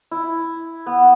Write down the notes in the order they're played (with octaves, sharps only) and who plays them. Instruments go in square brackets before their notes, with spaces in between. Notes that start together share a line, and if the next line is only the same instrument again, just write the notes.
[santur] E4
B3